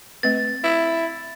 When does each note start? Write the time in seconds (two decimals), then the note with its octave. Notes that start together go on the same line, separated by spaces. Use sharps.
0.23 A3 C4 B4 A6
0.64 E4